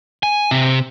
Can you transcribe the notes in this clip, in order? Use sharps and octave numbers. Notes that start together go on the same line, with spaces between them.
G#5
C3